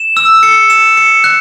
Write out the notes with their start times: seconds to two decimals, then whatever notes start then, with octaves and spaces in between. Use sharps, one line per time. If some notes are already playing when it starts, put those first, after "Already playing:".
Already playing: E7
0.17 E6
0.43 C#7
0.70 E7
0.97 C#7
1.24 F#6